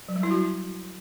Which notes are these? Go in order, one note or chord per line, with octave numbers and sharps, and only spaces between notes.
F#3
G3
E4
F#4